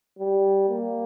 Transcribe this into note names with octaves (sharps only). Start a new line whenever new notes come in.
G3
A#3